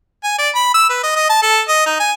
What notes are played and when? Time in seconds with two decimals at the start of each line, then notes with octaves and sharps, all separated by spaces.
0.24 G#5
0.38 D5
0.55 B5
0.74 E6
0.90 B4
1.03 D#5
1.16 D#5
1.29 A5
1.42 A4
1.68 D#5
1.86 D#4
2.00 G#5